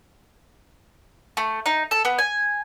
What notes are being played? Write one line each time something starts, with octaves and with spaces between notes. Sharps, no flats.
A3
D#4
A4
B3
G#5